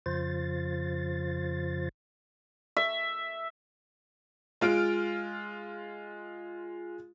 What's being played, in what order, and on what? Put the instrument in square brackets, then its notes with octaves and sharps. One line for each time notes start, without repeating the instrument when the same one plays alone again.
[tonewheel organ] F2 C#3 F3 F4 C5 A6
[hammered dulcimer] E5
[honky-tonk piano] G#3 F4 F6 D7